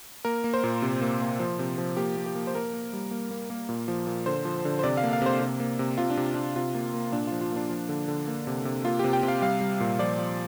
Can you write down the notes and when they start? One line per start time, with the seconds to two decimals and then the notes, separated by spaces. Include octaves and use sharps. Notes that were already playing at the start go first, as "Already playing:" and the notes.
0.25 A#3 A#4
0.44 A#3
0.54 C5
0.64 A#2
0.82 C3
1.01 A#3
1.21 A#3
1.40 F3
1.59 C3
1.78 F3
1.97 A#3 G4
2.17 A#3
2.26 G4
2.35 A#3
2.47 C5
2.55 A#3 A#4
2.73 A#3
2.93 G3
3.11 A#3
3.31 A#3
3.50 A#3
3.69 A#2
3.88 F3
4.07 A#2
4.26 D3 C5
4.45 F3
4.65 D3
4.79 C5
4.83 C3 D5
4.97 F5
5.03 A#3
5.13 F5
5.22 C3 C5
5.41 C3
5.60 A#3
5.79 C3
5.98 C3 F4
6.10 D4
6.17 C3
6.34 C3 D4
6.56 C3 F4
6.75 A#3
6.94 A#3
7.12 A#2 D4
7.27 F3 F4
7.41 F4
7.52 A#3 D4
7.69 F3
7.89 D3
8.08 D3
8.27 A#3
8.47 C3
8.65 C3
8.85 A#3 F4
8.99 C3 G4
9.13 G5
9.23 C3
9.28 F5
9.42 G3 F5
9.61 G3
9.80 A#2
9.99 F3 D5
10.18 F3